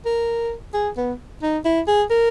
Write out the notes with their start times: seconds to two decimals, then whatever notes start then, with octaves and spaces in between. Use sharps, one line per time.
0.06 A#4
0.74 G#4
0.97 B3
1.42 D#4
1.65 E4
1.88 G#4
2.10 A#4